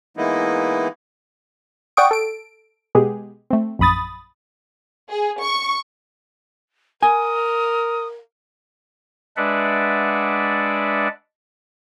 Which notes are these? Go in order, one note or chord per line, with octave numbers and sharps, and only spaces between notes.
E3 G#3 A#3 B3 D#4 E4
D5 F#5 G5 C#6 D#6 D7
A4 D7
B2 G#3 B3 G4 G#4
A3 C4
A#1 F#2 B5 D#6 A6
G#4
C#6
A#4 G#5 D#6
G#3 D4 B4 D5 E5 F#5